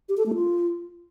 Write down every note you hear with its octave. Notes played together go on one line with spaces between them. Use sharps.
G4
A4
A3
F4